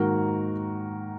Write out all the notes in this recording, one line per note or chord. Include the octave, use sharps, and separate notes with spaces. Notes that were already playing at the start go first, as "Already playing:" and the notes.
Already playing: G#2 D#3 A#3 F#4 A#4